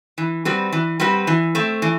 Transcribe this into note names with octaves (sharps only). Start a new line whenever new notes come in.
E3
G3 C4 F#4 B4
E3
G3 C4 F#4 B4
E3
A3 C4
E3